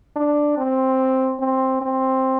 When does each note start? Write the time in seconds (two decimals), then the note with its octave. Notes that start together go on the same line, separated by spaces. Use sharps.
0.16 D4
0.57 C4
1.39 C4
1.81 C4